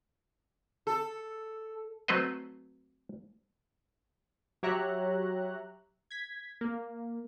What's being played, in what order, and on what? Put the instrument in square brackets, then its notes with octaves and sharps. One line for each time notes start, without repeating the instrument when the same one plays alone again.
[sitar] A4
[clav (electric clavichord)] F#3 A3 C4 B4 C5 D#5
[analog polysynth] F#3 G4 C#5 E5 A#5 F#6
G#6 B6
A#3